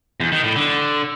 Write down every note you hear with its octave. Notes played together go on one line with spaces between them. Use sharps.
E2
D#3
A2
D3